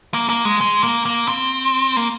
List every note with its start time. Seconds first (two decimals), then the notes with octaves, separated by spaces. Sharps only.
0.14 A#3
0.30 A#3
0.45 G#3
0.61 G#3
0.83 A#3
1.05 A#3
1.28 C4
1.96 A#3